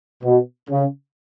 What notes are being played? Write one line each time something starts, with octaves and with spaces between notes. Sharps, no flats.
B2
C#3